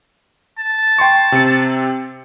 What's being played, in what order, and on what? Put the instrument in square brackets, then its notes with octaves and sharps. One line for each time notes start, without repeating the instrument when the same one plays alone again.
[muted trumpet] A5
[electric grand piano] G5 C6 C#6
C3 C4 C#7